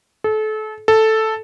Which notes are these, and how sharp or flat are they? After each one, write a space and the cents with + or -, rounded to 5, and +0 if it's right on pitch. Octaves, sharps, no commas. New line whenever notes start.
A4 -30
A4 +0